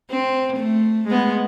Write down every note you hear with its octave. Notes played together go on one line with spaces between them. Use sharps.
C4
A3
G#3 B3